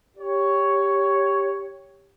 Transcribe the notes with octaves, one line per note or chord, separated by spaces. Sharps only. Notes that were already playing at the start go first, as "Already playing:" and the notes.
G4 C#5